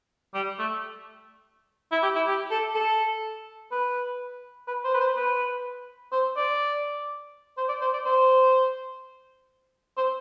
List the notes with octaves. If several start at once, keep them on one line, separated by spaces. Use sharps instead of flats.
G3
A3
E4
G4
E4
G4
A4
A4
B4
B4
C5
B4
C5
B4
C5
D5
C5
D5
C5
D5
C5
C5